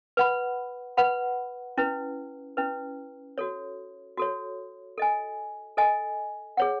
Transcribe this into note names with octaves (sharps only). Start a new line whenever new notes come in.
B4 F#5 B5
B4 F#5 B5
C#4 E4 B4
C#4 E4 B4
F#4 A4 C#5
F#4 A4 C#5
A4 D#5 G#5
A4 D#5 G#5
G#4 C#5 F#5